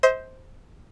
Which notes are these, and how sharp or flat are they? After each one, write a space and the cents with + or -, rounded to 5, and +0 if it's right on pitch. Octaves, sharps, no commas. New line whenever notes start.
C5 +0 D#5 +45